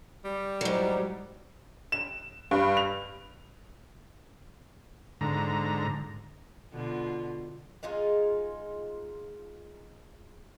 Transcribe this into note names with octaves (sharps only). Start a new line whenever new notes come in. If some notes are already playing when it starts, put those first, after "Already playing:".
G3
G#2 F#3
E7
G2
F7
G#2 D3 A#5
B2 D3 F4
G#3 D#4 F4 G#4